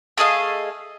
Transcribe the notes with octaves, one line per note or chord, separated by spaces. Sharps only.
A3 G#4 D#5 F5